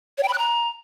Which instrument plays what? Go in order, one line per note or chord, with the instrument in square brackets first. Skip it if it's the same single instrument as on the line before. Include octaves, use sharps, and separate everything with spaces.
[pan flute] C#5
G5
B5
F#6
A#5